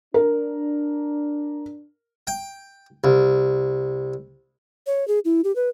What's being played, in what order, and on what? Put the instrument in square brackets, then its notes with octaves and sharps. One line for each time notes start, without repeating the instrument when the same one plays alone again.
[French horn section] D4 [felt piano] A#4
[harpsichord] G5
C2
[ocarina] C#5
G#4
E4
G4
B4